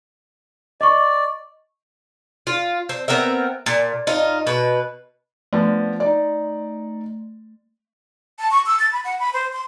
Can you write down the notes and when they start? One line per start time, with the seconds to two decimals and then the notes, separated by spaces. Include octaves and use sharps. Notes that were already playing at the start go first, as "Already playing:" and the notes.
0.81 D5 D#5 C#6
2.47 F4
2.89 C4
3.08 B3 C4 A#4 E5
3.66 A#2
4.07 D#4 F4
4.47 B2 B4
5.53 F3 A3 B3 D4
6.00 D#4 D5
8.39 A5
8.51 C#6
8.66 E6
8.79 A6
8.92 B5
9.04 F#5
9.19 B5
9.33 C5
9.53 C6